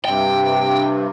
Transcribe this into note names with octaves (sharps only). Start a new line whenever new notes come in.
G2 C3 G5